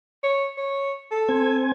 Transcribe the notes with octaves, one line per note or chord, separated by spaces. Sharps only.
C#5
C#5
A4
C4 G#5